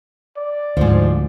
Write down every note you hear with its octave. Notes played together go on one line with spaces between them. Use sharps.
D5
D2 G#2 F3